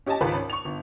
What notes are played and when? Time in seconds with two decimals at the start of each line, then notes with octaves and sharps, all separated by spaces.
0.06 C#4 G4 D#5 G#5 A5
0.21 G#1 C#2 A#4 B4 A5 B5
0.34 C#4
0.50 C#6 F7
0.65 G1